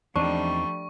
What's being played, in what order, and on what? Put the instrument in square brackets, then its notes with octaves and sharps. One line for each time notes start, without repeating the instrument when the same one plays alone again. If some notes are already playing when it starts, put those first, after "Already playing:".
[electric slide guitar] E2 C4 D#4 [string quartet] F3 G3 A3 [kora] D4 [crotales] C#6